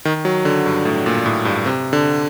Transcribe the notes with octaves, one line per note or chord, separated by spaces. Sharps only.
D#3
F#3
D3
G2
A2
A#2
A2
G2
C3
D3